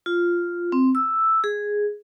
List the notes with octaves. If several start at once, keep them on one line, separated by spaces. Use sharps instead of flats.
F4
C4
E6
G#4